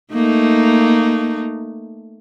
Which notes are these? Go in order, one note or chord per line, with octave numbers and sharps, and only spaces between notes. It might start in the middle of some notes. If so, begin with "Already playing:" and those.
A3 A#3 D#4